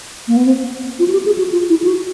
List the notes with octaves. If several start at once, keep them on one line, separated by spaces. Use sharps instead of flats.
A#3
B3
C4
F4
F#4
G4
G#4
F#4
F4
E4
F4
F#4